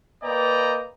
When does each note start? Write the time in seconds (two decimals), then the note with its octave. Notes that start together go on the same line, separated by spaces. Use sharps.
0.23 A#3 B4 D5 D#5 G5 A#5